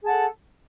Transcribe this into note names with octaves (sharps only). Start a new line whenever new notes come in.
G#4 A4 F#5 A5